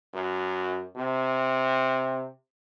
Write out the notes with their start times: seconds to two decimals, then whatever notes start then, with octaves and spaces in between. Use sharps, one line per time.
0.14 F#2
0.96 C3